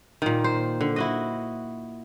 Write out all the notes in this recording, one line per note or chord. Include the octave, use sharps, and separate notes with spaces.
A#2 D#3
C5
D3
E4 F#4 D#5